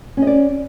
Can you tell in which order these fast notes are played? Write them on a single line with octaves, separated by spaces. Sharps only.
C#4 D#5 D5